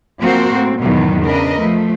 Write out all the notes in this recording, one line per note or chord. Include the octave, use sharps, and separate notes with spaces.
F3 A#3 C4 F#4 A#4 C5
A2 C4
E2 G#2 B2 D#3 F#3
C#3 D4 A#4 B4 D#5
F3 A3